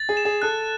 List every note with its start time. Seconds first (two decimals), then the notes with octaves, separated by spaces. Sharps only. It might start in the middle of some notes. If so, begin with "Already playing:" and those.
Already playing: A6
0.09 G#4
0.17 E7
0.25 G#4
0.42 A4 F#6